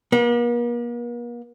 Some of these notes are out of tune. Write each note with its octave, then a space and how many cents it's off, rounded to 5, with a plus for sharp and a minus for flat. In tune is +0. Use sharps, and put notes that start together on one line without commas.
A#3 +45